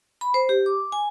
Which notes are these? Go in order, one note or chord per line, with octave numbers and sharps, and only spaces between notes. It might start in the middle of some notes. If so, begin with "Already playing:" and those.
B5
C5
G4
D6
G#5